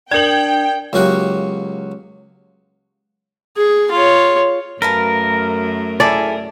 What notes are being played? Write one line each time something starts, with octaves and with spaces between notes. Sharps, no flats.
D4 A#4 D5 G5 G#6 F#7
C#2 F#3 A#3 F#4 G4 F#5
G#4
F4 C#5
F#2 A3 A#4 B4 F5 A5
E4 G#4 A4 D5